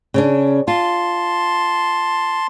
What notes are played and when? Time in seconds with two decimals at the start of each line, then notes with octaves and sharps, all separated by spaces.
0.14 C#3 C#4 D4
0.68 F4 A5 C6